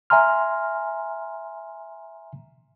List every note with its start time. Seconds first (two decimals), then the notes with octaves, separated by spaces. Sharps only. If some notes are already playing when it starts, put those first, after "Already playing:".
0.10 E5 G#5 A#5 C6 F6